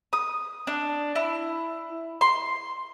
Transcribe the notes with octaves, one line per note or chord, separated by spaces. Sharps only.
D#6
D4
E4
C6